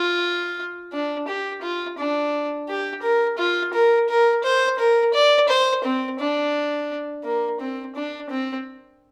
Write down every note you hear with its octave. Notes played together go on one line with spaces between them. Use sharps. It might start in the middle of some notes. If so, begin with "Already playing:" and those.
Already playing: F4
D4
G4
F4
D4
G4
A#4
F4
A#4
A#4
C5
A#4
D5
C5
C4
D4
A#3
C4
D4
C4